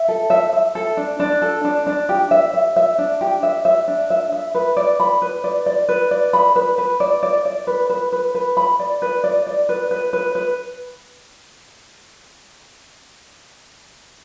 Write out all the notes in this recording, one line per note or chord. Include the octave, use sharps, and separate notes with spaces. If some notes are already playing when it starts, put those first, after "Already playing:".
Already playing: E5
A4
E5
E5
A4
D4
D4
A4
D4
D4
G4
E5
E5
E5
D4
G4
E5
E5
D4
E5
E5
B4
D5
B5
B4
D5
D5
B4
D5
B5
B4
B4
D5
D5
D5
B4
B4
B4
B4
B5
D5
B4
D5
D5
B4
B4
B4
B4